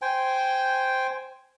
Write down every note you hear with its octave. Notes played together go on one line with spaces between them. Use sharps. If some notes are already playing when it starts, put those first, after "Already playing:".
C5 G5 G#5